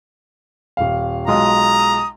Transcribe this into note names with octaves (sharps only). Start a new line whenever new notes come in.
D#1 F5
B1 G#3 F4 A#5 D#6